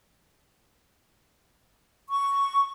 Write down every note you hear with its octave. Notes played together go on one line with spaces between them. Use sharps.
C#6